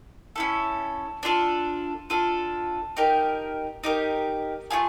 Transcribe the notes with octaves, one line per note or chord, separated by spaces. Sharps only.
C#4 E4 A4
D4 F4 A4
D4 F4 A4
D#4 G4 A#4
D#4 G4 A#4
A3 C#4 F4 G#4